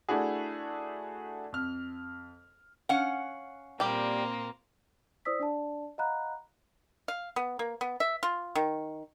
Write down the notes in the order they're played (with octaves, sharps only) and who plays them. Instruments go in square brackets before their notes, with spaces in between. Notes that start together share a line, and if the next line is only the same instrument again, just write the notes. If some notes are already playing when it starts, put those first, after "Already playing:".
[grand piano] A3 D4 E4 F#4 G#4
F2 F6
[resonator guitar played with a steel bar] C#4 F5 F#5
[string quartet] A#2 A#3 C4 [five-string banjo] G3 G4
[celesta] E4 C5 D5 D#6 E6 B6
D4 D5 A5
D#5 F5 F#5 A#5 B5 F#6
[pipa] F5
B3
A#3
B3
E5
F4
D#3